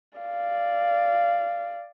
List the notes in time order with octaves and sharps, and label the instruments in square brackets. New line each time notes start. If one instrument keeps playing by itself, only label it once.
[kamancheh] D5 F5